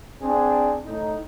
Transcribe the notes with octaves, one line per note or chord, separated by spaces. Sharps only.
C4 D4 G#4
A2 D#4